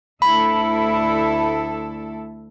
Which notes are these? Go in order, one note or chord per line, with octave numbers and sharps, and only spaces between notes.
D2 E4 A4 B5